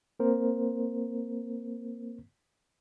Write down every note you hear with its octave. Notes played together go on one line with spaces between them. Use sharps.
A#3 C4 A#4 C5